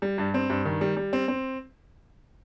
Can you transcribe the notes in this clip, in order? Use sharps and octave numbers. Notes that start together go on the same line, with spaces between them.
G3
G2
C4
G2
D#3
G3
G3
C4
C4